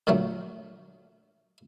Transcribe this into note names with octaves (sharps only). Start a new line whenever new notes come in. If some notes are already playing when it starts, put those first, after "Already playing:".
A#2 D3 F#3 A3